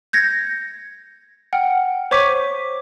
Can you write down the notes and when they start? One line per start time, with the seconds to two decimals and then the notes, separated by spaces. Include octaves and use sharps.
0.13 G6 G#6 A#6 C#7
1.53 F#5 G5 F6
2.11 C5 C#5 C#6 D6 B6 D#7